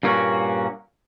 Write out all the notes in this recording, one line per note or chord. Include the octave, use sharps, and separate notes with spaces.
G2 A#2 A#3 C#4 F4 F#4